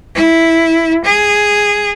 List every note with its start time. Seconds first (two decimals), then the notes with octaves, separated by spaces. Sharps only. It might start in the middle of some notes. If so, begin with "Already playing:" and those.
0.15 E4
1.04 G#4